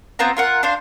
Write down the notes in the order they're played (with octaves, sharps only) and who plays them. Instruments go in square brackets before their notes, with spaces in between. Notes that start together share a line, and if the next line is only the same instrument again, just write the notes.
[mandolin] B3 C4 F4 A#5
F4 A#4 F#5
D4 C5 F5